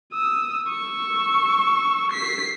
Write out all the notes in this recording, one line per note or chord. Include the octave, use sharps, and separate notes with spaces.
D#6 E6
C#6 E6
B6 C7